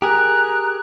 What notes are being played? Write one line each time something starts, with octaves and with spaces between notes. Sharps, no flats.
G4 G#4 A#4 A#5 F#6